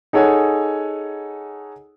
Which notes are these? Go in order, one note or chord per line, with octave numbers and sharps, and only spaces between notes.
D#4 G#4 A4 C#5 F#5 G#5